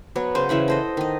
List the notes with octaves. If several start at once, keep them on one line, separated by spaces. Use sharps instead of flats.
F#3 B3 C#5
C#3 C#4 C5
C#3 E3 E5 F#5
A4 C5 D#5
D#3 D#5